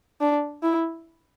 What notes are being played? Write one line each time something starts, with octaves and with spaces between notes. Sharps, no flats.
D4
E4